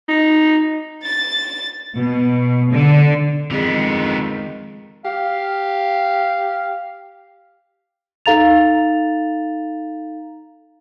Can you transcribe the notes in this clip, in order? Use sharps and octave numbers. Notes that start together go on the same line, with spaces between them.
D#4
A6
B2
D3
F2 D3 D#3 G#3 B3
G4 F5
D#4 A4 F5 A#5 A6 F7